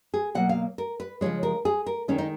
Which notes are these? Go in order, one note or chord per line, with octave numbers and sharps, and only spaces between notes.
G#4
B2 F#3 A#3 F#5
F5
A#4
B4
C#3 F3 G#3 C#5
A#4
G#4
A#4
D#3 G#3 C#4
D#4